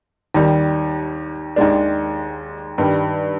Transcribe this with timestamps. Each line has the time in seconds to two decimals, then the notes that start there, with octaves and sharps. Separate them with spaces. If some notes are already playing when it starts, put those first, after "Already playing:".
0.34 D#2 D#3 G3
1.56 D#2 D#3 G#3 D4
2.78 G2 D#3 G3